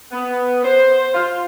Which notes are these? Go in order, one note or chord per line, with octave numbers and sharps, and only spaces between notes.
B3
C5
F4